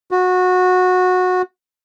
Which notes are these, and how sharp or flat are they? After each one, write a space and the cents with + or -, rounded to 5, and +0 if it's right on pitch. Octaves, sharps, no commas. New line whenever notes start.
F#4 -20